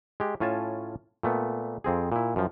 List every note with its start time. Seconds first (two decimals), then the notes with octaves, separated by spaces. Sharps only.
0.20 G#3 G4
0.40 A2 C#4 F4 G#5 A5
1.23 A#2 A3 B3
1.84 F2 C4 G#4
2.12 A#2 E4
2.36 F#2 F3